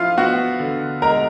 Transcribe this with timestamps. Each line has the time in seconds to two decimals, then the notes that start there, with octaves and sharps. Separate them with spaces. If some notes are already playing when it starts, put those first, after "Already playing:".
Already playing: F3 E4 F4 F5
0.17 B3 F#4 F#5
0.60 D3
1.02 G#3 A#4 A#5